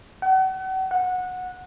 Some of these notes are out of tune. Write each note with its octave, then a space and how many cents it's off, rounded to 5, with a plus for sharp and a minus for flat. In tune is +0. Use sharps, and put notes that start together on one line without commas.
F#5 +40
F#5 -15